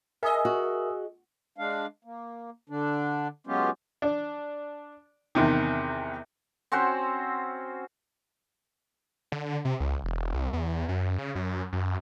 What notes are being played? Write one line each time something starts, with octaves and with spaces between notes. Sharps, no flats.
G#4 A#4 D#5 E5 G#5 D#6 E6
F#4
G#3 D4 F5
A#3
D3 D4
F#3 G#3 B3 C#4 F4 G4
D4
E2 C3 D#3
C4 C#4 F#4 C5
D3
C3
C#2
E1
C2
E2
F#2
C#3
F#2
F#2